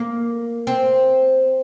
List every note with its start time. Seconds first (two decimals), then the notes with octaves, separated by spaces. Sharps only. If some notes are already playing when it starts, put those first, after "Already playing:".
Already playing: A#3
0.67 C4